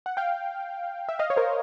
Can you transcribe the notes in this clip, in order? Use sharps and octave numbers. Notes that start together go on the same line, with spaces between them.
F#5
F5 G5
E5
D#5 F5
C#5
A#4 C5